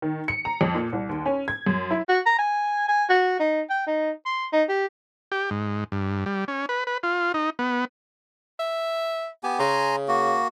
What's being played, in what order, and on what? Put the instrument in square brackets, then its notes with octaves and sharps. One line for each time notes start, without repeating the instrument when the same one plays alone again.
[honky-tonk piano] D#3
C#7
A#5
F2
A#2
C2
D#2
C#4
G#6
F#2
E4
[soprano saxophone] F#4
A#5
G#5
G#5
F#4
D#4
G5
D#4
C6
D#4
G4
[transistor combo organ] G4
G#2
G2
G3
C#4
B4
B4
F4
D#4
B3
[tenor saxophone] E5
[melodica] B3 G4 G#5
[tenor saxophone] C#3 [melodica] G#5 A#5 C6
[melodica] A#3 F#4